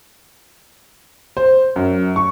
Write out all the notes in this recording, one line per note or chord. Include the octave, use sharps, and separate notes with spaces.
C5
F#2
C#6